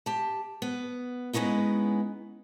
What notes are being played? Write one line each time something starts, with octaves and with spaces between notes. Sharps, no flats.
G4 A5
B3
G#3 B3 C#4 D#4 E4